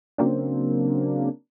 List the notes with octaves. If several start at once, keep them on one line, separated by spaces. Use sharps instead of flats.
C#3 F#3 A#3 C4 D4